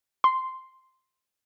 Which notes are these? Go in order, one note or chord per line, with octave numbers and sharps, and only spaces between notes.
C6